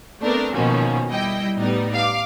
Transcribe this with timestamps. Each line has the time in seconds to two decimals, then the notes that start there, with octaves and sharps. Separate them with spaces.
0.20 A3 B3 C4 D4 A#4
0.53 B2 D#3 F3 A#3 C#4 F#4
1.10 G3 E4 D#5 G5
1.56 A2 G3 B3 D#4
1.94 F5 D6